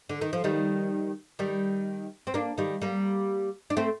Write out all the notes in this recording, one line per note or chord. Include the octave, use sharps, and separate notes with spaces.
D3
D#3
F3
D#3 G3
D#3 G3
C4
A#3 D4
D#3 G3
G3 A#3
D4
A3 C4